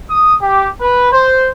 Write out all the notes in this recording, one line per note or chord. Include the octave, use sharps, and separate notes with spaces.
D#6
G4
B4
C5